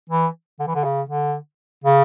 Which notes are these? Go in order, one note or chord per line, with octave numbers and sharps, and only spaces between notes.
E3
D3
E3
D3
C#3
D3
C#3